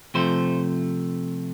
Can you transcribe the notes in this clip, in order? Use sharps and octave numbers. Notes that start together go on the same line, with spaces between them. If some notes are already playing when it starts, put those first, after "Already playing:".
C3 F3 A3 C5